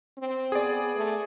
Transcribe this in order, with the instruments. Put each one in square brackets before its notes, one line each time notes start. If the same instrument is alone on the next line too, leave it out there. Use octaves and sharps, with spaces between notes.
[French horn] C4
[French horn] B3 [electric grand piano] G#4 D5
[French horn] A3